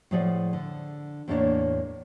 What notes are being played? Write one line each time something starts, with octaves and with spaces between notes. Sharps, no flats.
A2 F3 G#4 D5 F#5
D3
E2 A2 A#3 C#4 D4 C#5